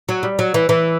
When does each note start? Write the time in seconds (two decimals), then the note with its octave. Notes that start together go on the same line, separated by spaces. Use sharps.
0.09 F#3
0.23 G3
0.39 F#3
0.54 E3
0.69 E3